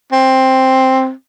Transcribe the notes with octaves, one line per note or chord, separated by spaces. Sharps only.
C4